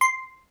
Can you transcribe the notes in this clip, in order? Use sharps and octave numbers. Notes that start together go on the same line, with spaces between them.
C6